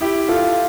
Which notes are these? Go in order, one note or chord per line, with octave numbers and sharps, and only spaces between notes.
E4 G4
F4 A4